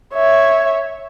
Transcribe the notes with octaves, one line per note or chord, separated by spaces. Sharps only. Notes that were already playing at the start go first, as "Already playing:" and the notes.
C#5 E5